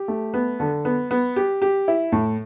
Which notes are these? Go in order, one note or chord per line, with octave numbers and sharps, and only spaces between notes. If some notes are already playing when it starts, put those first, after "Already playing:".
Already playing: G4
A3
B3
D3
B3
B3
G4
G4
E4
A2